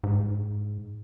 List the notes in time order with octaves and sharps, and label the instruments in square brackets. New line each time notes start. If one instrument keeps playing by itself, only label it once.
[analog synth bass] G#2